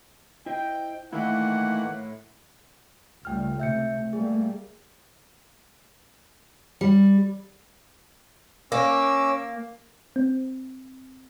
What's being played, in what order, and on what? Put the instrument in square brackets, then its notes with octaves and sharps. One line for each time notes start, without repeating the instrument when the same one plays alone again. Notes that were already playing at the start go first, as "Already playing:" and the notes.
[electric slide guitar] E4 C5 D#5 [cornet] G5
[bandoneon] D#3 E3 A#3 [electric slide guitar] A3 [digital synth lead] E4 [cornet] F#5
[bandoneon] A2
[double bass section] C#2 G3 A3 [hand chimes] G5 F6
[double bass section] C3 A3 [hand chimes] E5 G6 C#7
[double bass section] G3 A3 A#3 [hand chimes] G#4
[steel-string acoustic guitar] G3
[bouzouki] A#3 [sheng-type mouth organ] C#4 D6 E6
[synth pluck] C4